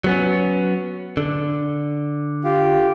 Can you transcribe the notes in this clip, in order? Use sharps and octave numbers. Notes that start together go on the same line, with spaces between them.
F#3 B3 C#4
D3
F4 G4